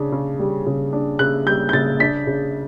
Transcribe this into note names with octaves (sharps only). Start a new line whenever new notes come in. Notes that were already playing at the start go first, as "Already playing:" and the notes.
Already playing: C#3 D4
C#3
G3
C#3
D4
C#3 F#6
G3 G6
G6
C#3 A6
D4 B6
C#3